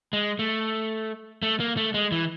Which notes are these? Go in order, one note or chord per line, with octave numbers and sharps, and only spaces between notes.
G#3
A3
A3
A#3
A3
G#3
E3